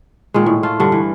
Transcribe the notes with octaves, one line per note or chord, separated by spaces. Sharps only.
A#2 D#3 G#3
A2
A3 F4
G2 D3
E3